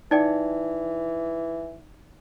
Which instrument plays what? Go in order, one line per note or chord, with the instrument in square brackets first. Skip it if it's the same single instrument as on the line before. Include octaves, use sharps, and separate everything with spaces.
[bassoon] E3 [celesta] D#4 D5 G5